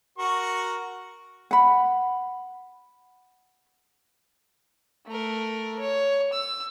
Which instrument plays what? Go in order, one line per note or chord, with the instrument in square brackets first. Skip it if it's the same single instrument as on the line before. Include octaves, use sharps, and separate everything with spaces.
[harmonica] F#4 A#4 C#6
[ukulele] F#5 B5
[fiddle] A3 A#4
C#5
E6